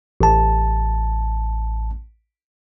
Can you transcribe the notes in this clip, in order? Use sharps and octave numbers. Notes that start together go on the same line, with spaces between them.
A1 A5